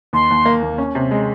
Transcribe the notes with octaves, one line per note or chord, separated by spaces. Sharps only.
D#2 C6
D#2
A#3
D#2
C#4
C3
G#3